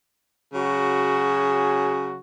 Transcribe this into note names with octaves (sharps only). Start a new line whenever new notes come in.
C#3 F#3 F#4 G#4